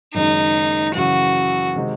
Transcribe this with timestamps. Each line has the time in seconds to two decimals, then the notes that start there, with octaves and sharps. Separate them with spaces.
0.14 F#1 F#2 D#3 G#3 D#4
0.95 F#2 C#3 E3 F#4
1.76 C3 D#3 G#3 C4